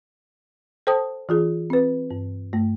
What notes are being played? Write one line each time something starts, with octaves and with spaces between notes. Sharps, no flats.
A4 C5 G5 A5 D#6
E3 F4 G#4
C4 B4
G2
G2 A3